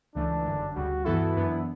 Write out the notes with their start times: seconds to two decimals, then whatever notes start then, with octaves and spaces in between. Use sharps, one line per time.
0.15 C#2 C#3 E3 A3 D4
0.46 G1 F#2 D3
0.75 D2 C#3 G3 F#4
1.05 G2 E3 B3 E4 F#4 A4
1.36 F#2 E3 B3 D4